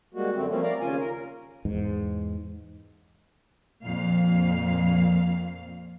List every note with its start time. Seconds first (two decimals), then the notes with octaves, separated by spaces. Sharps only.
0.14 G3 G#3 A#3 F#4
0.34 F#2 D3 A3 C4
0.49 F3 G3 A3 A#3 C4 C#4
0.63 A#4 D5 F5 A#5
0.80 D#2 C#3 C#4 F4 G#5
0.99 A#4
1.65 E2 G#2
3.84 F2 A#2 F5